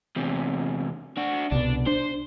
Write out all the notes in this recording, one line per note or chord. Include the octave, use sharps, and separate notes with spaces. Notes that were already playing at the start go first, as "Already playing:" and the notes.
E2 C3
D4 F#4
C2 B2 D4
D4 C5